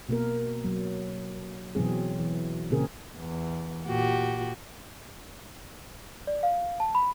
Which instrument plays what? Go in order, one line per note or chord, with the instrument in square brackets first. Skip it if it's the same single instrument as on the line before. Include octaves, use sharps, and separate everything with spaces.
[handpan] B2 A#3 A#4
F#3
B2 E3 F#3 C4 G#4
E3
A#2 C#3 C4 G#4 A#4
[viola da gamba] E2
A#2 F#4 G4
[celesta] D5
F5
A5
B5